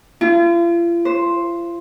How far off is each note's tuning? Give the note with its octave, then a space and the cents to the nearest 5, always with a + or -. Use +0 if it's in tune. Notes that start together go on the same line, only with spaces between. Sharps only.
F4 -40
C5 +5